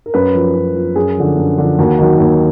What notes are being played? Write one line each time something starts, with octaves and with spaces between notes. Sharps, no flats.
A#4
F#2 B4
F3
F#2
F3
F#2 G#4
D3 F3
F#2
D3 F3
D#2 F#4
D#3 F#3
D#2